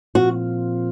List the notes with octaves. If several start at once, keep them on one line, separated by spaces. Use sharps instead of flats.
A#2 F3 C4 F4 F#4